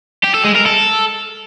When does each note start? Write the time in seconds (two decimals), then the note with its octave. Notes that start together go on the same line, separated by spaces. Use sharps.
0.24 G4
0.34 A4
0.45 G#3
0.55 A#4
0.66 A4